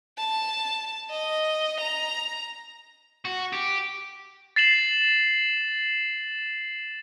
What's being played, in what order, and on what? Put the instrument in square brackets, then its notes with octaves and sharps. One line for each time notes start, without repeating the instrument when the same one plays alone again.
[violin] A5
D#5
A#5
[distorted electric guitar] F#4
G4
[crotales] A6 C7 E7 F#7